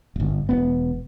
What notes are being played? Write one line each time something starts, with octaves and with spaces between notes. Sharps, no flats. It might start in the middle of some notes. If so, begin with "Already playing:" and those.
D1 G1
E1 B3